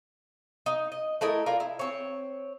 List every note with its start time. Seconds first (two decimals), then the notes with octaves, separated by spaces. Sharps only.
0.66 D#4
0.92 D#5
1.21 A3 E4 A#4 D#5
1.46 F4 A#4 D5
1.60 E4
1.79 C4 C#5